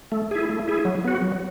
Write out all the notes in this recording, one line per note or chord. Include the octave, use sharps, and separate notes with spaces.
A3
E4 G#4
A3
E4 G#4
F#3
B3 F#4
F#3